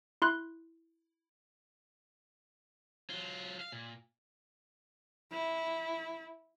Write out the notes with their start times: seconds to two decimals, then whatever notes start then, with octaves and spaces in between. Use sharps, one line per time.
0.22 E4 C6 F#6
3.10 F#3 F4
3.61 F5
3.72 A#2
5.32 E4